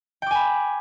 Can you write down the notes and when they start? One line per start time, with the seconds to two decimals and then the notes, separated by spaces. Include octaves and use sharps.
0.22 G5
0.26 D6
0.31 G#5
0.35 B5